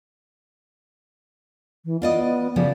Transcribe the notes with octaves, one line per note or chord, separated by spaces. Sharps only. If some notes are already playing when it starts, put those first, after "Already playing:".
E3
B3 F4 D5 D#5
C#3 F3 G3 D5